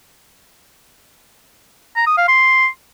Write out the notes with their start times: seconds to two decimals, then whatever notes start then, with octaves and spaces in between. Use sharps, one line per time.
1.96 A#5
2.07 D#6
2.17 F5
2.28 C6